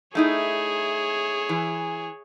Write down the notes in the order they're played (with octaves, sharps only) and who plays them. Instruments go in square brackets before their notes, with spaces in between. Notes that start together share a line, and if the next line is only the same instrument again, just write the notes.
[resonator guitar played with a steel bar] A3 D#4 E4 [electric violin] G#4 C#5
[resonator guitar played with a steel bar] E3